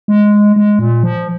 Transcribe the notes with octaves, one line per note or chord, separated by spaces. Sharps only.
G#3
G#3
A#2
F3